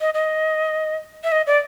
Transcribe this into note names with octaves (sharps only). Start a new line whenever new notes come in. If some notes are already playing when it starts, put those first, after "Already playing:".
D#5
D#5
E5
D#5
D5